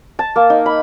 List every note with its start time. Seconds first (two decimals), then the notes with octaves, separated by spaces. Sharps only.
0.19 A5
0.36 A#3
0.50 D#4
0.66 B5